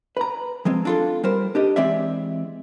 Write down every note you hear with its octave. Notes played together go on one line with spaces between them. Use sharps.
B4 A#5
F3 G#3 C4
D4 F4 A4
G3 A#4 C5
D4 G4 D#5
E3 G#3 C4 D5 E5